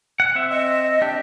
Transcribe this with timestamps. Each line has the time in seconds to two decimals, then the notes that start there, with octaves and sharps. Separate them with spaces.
0.20 F#5
0.35 C4 E5
0.51 D#5
1.01 D4 G4